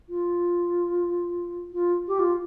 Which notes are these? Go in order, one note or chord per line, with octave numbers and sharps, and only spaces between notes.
F4
F4
G4
F4